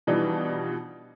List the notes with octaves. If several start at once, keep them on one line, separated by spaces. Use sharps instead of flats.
B2 E3 F3 G3 D4 D#4